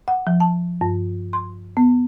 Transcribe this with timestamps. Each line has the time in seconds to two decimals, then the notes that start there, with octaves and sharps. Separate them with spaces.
0.08 F#5
0.27 F3
0.40 A5
0.81 G2
1.33 C6
1.77 B3